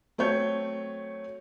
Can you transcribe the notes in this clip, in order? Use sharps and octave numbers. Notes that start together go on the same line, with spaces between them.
F#3 A3 C4 C#5 G6